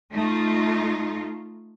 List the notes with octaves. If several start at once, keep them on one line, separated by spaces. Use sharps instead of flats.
A3 D#4 F4